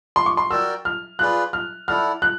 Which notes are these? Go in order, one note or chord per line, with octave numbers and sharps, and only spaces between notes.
C6
C#6
C6
F#4 A#4 D5 G5 E6
F6
F4 G#4 B4 D5 F#6
F6
E4 A4 D5 F#5 F6
F#6